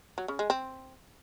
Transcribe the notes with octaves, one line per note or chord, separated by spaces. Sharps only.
F#3
C#3
G#3
C4